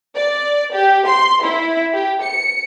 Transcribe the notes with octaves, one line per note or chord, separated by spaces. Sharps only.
D5
G4
C6
E4
G4
C#7